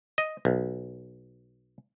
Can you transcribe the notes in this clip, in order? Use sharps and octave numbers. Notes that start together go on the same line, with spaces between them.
D#5
B1